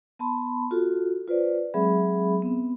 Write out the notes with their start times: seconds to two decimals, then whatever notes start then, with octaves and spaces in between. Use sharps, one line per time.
0.19 B3 A5 B5 C6
0.71 F4 F#4 A4
1.27 F4 B4 C5 D5
1.74 F#3 G#3 C4 G#4 E5 B5
2.42 B3 C4